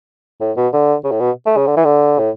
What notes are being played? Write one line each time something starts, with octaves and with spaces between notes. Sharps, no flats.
A2
B2
D3
C#3
A2
B2
A3
C#3
D3
E3
D3
A2